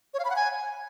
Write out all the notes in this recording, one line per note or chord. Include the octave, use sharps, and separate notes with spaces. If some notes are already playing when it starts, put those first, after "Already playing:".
C#5
F5
B5
F#5
G#5